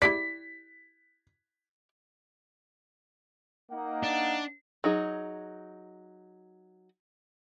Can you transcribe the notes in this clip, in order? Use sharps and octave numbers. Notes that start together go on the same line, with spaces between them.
E4 G4 D5 B6
A#3 D#4 F#5
D4
F#3 D#4 G#4